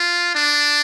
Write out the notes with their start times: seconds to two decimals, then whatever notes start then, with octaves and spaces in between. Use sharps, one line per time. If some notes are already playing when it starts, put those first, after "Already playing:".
Already playing: F4
0.35 D4